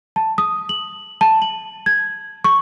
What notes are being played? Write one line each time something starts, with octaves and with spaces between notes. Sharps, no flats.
A5
D#6
F#7
A5
F#7
G#6
C#6